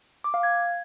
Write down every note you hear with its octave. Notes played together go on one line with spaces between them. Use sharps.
D6
F5
G#6